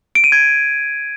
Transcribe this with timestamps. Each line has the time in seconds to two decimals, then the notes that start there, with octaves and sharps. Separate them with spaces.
0.15 D7
0.24 D#7
0.32 G#6